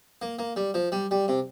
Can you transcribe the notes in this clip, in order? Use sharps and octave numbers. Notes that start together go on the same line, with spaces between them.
A#3
A#3
G3
F3
G3
G3
C3